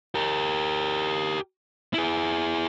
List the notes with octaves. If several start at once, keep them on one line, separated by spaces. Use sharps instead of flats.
G4 A#4
E4 G#4